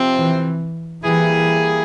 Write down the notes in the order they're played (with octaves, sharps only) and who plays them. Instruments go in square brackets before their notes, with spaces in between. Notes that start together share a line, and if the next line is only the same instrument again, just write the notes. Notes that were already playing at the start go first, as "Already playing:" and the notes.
Already playing: [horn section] C3 F3 C4
[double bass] E3
[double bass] E3 [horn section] G3 A#3 E4 G#4